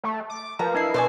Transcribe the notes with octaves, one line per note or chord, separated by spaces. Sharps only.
A3
D6
F3 A#4 B4 A#5
D4 E4 D#5 C7
B2 B4 C5 D5 G#5